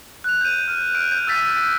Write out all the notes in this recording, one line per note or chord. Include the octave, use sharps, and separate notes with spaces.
F#6 F7
G6 D#7
F6
F6 D7
G6
E6 F6 A6 B6 D#7